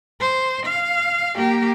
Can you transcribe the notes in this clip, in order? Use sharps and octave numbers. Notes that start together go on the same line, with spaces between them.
C5
F5
A#3 G4